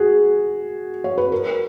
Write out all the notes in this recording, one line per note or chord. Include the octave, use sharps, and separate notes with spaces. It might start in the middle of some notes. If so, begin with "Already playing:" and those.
Already playing: F#4 G#4
C#5
B4
A#4